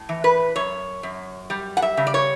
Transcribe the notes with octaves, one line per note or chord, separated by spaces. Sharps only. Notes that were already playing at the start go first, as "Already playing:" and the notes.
Already playing: A2
E3
B4
F#2 C#5
F#2
G3
F#5
E5
C#3
D5
C#5